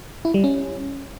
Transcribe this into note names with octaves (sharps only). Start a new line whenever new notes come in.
E4
G3
C#4